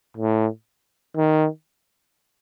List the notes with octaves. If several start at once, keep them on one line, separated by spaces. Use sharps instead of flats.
A2
D#3